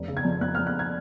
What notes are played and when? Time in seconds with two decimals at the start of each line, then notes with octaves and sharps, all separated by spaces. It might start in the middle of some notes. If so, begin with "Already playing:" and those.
Already playing: F1
0.08 C#3
0.17 G#6
0.25 F2
0.41 F2 F#6
0.55 F6
0.59 F2
0.67 F#6
0.79 G#6